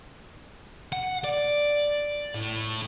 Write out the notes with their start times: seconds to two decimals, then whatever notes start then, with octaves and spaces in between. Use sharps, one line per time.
0.93 F#5
1.24 D5
2.35 A2